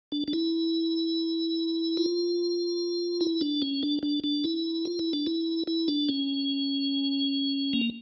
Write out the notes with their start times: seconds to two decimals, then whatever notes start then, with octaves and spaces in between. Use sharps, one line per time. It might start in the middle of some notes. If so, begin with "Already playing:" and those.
0.12 D4
0.28 D4
0.33 E4
1.97 F4
3.21 E4
3.41 D4
3.62 C#4
3.83 D4
4.03 D4
4.24 D4
4.44 E4
4.85 F4
4.99 E4
5.13 D4
5.26 E4
5.67 E4
5.88 D4
6.09 C#4
7.73 A#3